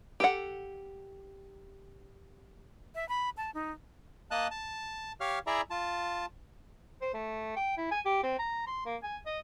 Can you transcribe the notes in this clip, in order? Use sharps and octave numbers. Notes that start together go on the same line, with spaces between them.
G4 A4 F#5
E5
B5
A5
D#4
A#3 D#5 A5 F#6
A5
G4 C#5 F5 F6
E4 G#4 D5 E5 A#5
F4 A5
C5
A3
G5
E4
G#5
G4
C4
A#5
C6
A#3
G#5
D#5